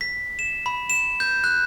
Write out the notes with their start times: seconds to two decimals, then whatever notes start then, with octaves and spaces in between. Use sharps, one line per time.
0.01 B6
0.39 E7
0.66 B5
0.90 E7
1.20 G6
1.44 F#6